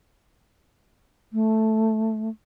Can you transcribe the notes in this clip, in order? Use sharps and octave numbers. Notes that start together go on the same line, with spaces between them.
A3